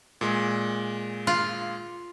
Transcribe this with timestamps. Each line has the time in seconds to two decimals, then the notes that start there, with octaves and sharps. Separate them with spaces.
0.21 A#2 G#3
1.27 F4